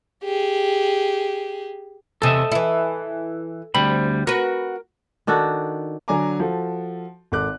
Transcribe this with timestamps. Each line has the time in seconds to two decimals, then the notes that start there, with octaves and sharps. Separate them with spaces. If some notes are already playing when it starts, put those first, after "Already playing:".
0.24 G4 G#4
2.22 E2 C3 A4 D#5 E5
2.52 E3 E4
3.75 D2 G3 C4 B5
4.27 F#4 A#4 B4
5.27 D#3 D4 F#4 A4
6.08 D3 F#3 D5 G#5 A#5 D6
6.40 F3 F#4 A4
7.32 G#1 A4 D6 F#6